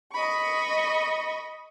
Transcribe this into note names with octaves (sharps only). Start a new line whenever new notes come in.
D#5 B5 C#6